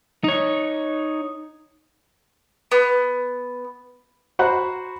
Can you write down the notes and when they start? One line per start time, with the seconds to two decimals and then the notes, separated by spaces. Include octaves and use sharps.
0.24 D#4 C#5
2.72 B3
4.39 F#4 C5 F#5 A#5 B5 F#6